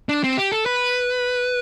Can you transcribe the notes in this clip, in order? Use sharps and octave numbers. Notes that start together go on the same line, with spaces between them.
D4
C4
G4
A4
B4